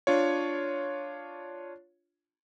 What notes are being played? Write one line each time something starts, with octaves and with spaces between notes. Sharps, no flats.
D4 F4 C#5